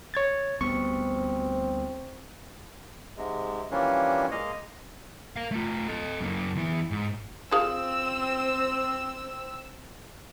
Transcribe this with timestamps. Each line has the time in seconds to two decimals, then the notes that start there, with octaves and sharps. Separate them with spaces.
0.14 C#5 G#6 A6
0.61 D2 G3 B3 C4 C#6
3.17 G#2 C3 G#3
3.71 E3 F3 G3 A#3 C#4 D4
4.31 G#3 A#3 D#5 F5
5.36 A#4 F5
5.52 A3 F4
5.88 A4 D#5
6.20 F#2 A#3
6.55 E2 E3
6.91 G#2
7.51 F3 C4 G#4 F5 E6